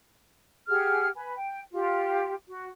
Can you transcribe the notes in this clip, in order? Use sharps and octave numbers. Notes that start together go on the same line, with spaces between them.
G4 G#4 F#5 F6
B4 G#5
G5
F4 G4
F#4